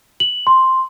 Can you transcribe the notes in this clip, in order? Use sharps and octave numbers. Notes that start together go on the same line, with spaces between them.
F#7
C6